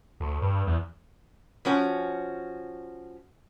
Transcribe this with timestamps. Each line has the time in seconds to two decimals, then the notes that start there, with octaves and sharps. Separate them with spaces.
0.20 D2
0.42 G2
0.67 E2
1.65 F3 C#4 F#4